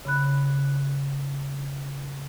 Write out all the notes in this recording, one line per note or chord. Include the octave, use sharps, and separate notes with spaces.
C#3 B5 F#6